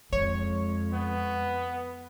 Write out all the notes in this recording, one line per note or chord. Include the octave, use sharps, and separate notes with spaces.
F2 G#3 C#5
B3